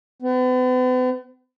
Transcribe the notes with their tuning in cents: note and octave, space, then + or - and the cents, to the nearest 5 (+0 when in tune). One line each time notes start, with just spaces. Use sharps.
B3 +45